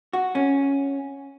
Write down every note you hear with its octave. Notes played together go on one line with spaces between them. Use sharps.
F#4
C#4